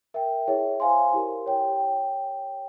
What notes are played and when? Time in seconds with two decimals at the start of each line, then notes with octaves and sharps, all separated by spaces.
0.14 A#4 E5 G5
0.47 E4 G#4 C#5 E5
0.80 C5 F5 G#5 C6
1.13 E4 G4 A#4
1.46 C#5 G5